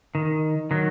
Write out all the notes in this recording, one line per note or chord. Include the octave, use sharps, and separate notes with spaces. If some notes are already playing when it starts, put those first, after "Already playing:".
D#3
D#3 F#3